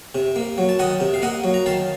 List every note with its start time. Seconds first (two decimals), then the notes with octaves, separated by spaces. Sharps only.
0.15 C3
0.36 A#3
0.58 F#3
0.69 A5
0.79 D#3 D#5 F#5
1.00 C3
1.14 F5
1.22 A#3 D#5 F#5
1.44 F#3
1.54 A#5
1.66 D#3 F5 A5